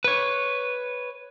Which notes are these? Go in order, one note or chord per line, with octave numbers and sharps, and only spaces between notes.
B4 C#5